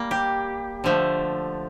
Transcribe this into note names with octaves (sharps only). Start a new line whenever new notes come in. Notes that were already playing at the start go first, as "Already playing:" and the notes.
Already playing: G3 A#3
G4
D3 F3 A3